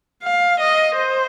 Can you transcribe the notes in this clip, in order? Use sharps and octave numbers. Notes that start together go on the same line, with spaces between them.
F5
D#5
C5